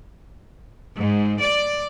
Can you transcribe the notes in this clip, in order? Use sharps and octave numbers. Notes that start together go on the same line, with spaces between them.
G#2
D5